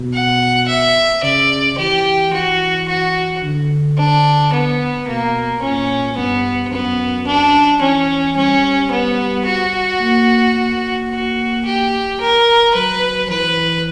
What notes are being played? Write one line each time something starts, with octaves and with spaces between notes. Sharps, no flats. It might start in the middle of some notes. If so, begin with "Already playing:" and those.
Already playing: B2
F#5
E5
C#3 D5
E3 G4
E3 F#4
F#4
D3
D4
B3
B2 A#3
A#2 C#4
G2 B3
F#2 B3
D4
E3 C#4
G3 C#4
B3
F#4
A#3
A#3
F#4
G4
A#4
F#3 B4
E3 B4